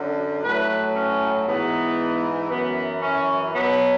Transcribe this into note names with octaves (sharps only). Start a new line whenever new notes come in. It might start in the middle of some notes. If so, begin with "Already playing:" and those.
Already playing: F#2 D3 F#3
A2 F#3 B4
C#4
G#2 E3 B3
F#2 E3 B3
C#4
B2 F#3 B3